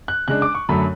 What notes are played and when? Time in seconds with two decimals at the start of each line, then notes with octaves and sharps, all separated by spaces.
0.08 F#6
0.28 C#3 G#3 D4 F#6
0.42 D6
0.55 C#6
0.69 F#2 D3 F#3 A3 B5